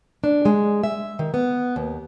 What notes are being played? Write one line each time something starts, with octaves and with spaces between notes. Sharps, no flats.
D4
G#3
E5
D#3
B3
D#2